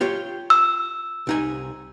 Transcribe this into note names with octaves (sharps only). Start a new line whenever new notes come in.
F4 G4 C#5
E6
C2 D#4 G#5